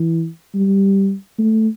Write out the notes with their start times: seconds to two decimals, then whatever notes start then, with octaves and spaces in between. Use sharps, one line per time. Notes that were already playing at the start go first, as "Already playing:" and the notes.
Already playing: E3
0.55 G3
1.39 A3